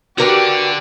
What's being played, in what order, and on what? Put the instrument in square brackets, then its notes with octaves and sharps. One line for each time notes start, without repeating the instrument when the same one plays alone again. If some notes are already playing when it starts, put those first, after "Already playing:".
[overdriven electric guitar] D3 D4 [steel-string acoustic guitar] F#4 A#4 B4 [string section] G4